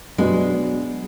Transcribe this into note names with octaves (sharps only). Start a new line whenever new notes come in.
B2 F#3 G#3 B3 D4